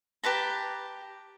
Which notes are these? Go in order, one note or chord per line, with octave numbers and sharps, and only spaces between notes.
G4 B4 A5 A#5